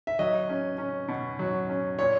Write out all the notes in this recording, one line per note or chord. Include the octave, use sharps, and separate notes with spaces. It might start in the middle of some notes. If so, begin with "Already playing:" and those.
E5
F#3 D#5
C#4
C#4
B2
F#3
C#4
A#2 C#5